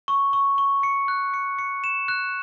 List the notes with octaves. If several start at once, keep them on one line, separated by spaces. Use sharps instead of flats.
C#6
C#6
C#6
C#7
F#6
C#7
C#7
E7
F#6